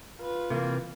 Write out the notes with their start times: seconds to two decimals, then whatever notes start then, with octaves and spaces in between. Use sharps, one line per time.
0.21 F4 B4
0.50 C3 E3 A#3